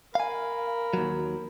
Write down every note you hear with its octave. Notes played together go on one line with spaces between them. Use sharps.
A#4 F5 G#5 B5
D#2 F#3